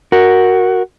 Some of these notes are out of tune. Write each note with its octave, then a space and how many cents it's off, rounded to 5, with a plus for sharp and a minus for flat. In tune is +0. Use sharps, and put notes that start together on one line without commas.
F#4 +0 A#4 +0